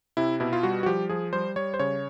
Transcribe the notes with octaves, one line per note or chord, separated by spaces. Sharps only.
C3 E4
B2 E4
F4
G3 F#4
F#4
F3 G4
F3 G#4
G3 C5
G3 C#5
C5
C#3 C#5